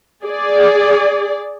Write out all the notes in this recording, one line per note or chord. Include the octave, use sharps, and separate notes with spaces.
G#4 D5